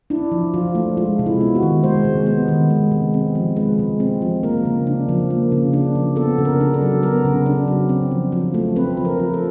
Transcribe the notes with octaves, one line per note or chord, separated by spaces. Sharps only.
D4 E4
F3
F3 F4
A3
G#3 F4
C3
E4
B3
F#4
D#3
G#3 C5
C3
B3
D#3
G#3
C3
C4
F3
G#3 B4
C3
C4
F3
A#3 A#4
C#3
D4
F3
A#3
C#3
D4
F3
B3 A4
C#3
A#4
D4
A4
F#3
B3 A#4
C#3
D4
F#3
C4
F3
F3
A3
C4 B4
F3
A#4
F3
A4